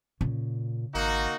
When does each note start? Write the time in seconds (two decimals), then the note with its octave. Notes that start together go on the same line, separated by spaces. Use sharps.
0.21 A#2 C#3
0.95 G#1 A#3 D#4 F#4